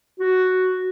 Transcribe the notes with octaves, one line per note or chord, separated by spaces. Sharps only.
F#4